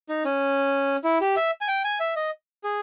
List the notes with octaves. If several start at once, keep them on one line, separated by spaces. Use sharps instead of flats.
D#4
C#4
E4
G4
E5
G#5
G5
G#5
E5
D#5
G#4